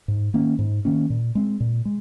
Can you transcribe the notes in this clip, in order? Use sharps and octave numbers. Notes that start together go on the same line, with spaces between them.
G#2
D#3 A#3 C#4
G#2
D#3 A#3 C#4
A#2
G#3 C4
A#2
G#3